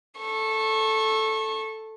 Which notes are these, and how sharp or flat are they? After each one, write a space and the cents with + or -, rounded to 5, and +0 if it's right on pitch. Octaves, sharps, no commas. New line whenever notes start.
A4 +0 C#6 -25